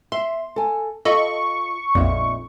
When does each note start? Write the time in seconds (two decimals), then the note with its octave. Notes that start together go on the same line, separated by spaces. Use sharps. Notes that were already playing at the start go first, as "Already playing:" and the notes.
0.12 E5 C6
0.56 A4 G#5
1.05 F4 A4 D#5 B5 C#6
1.95 A#1 F2 A#2 D#4 E5